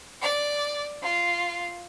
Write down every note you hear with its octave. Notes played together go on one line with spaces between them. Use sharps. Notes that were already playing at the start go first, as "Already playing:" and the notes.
D5
F4